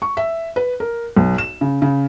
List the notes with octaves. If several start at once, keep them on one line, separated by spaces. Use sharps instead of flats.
C#6
E5
B4
A#4
B1
E7
C#3
C#3